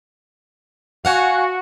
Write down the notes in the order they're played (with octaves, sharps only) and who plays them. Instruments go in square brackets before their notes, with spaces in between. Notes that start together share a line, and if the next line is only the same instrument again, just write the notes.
[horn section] F#4 [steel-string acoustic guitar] F5 F#5 G#5